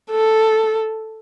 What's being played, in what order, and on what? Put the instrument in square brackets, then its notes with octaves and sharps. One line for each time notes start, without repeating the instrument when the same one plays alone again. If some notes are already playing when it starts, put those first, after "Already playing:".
[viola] A4